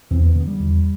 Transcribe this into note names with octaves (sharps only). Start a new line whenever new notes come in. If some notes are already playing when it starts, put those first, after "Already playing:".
E2 C4
B3
D3 B3
G3
E2